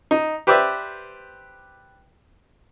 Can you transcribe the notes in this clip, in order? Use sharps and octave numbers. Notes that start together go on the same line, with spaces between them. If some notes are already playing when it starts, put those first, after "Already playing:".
D#4
G4 B4 C5 D5 E5